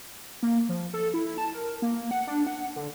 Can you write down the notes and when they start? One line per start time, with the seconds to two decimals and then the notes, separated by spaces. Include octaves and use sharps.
0.43 A#3
0.69 F3
0.94 A4
1.14 E4
1.38 A5
1.54 A#4
1.82 A#3
2.11 F#5
2.27 D4
2.47 F#5
2.76 D3